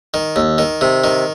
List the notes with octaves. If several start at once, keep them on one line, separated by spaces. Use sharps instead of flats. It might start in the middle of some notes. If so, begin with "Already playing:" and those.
D#3
D#2
D#3
C3
D#3